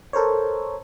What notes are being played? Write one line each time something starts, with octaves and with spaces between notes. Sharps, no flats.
A4 A#4 C5 C#5